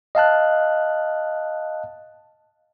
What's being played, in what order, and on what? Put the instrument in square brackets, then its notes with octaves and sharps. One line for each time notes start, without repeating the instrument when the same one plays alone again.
[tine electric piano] D#5 F5 A5 F#6